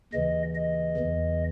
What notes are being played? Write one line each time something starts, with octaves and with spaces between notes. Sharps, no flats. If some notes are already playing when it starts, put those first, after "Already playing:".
D#2 C#3 E3 D#5
D#5
E2 C#3 E3